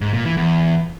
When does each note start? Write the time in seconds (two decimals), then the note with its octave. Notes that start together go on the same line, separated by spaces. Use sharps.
0.01 G#2
0.13 A#2
0.25 E3
0.37 E2